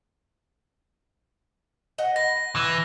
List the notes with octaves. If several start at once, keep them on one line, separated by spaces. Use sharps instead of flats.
D#5 F#5
B4 A#6
E3